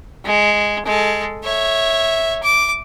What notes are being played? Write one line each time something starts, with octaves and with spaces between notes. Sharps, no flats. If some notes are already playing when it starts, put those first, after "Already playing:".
G#3
G#3 A4
C#5 E5
D6